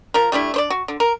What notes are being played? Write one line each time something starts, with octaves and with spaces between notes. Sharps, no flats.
F3 A#4
G3 A3 D4 E4
D4 C5 D5
F#4
D3
A#4